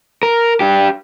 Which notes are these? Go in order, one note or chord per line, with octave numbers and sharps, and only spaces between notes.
A#4
D4 G4